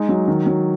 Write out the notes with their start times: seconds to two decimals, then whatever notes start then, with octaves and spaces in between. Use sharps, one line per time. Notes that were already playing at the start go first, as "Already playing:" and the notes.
Already playing: G#3 D#4
0.09 F#3
0.28 D#3
0.47 F#3